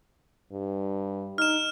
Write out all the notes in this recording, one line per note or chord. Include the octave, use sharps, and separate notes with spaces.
G2
D#4 F6 E7